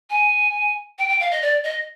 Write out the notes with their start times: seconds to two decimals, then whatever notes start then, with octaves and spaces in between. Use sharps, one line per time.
0.10 G#5
0.98 G5
1.09 G5
1.20 F5
1.31 D#5
1.42 D5
1.64 D#5